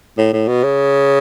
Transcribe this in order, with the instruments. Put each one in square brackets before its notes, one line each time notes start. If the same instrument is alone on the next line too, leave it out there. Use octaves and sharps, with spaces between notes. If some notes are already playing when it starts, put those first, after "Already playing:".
[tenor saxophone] A2
A2
B2
C#3